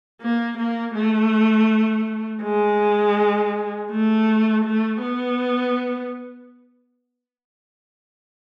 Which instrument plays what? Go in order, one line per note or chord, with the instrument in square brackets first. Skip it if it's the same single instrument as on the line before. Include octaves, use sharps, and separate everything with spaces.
[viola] A#3
A#3
A3
G#3
A3
A3
B3